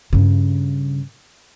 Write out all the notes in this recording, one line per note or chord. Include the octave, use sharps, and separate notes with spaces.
G2 C#3